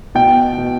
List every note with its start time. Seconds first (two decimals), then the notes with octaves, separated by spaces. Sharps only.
0.15 B2 G5
0.58 B2